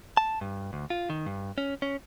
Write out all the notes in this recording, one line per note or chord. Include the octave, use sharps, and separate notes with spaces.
A5
G2
D2
F4
D#3
G2
C#4
C#4